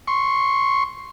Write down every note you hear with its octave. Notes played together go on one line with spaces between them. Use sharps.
C6 C#6